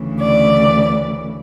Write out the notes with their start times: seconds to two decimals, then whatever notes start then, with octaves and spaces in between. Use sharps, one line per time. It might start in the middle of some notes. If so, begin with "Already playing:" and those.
Already playing: D2 C#3 E3
0.21 D5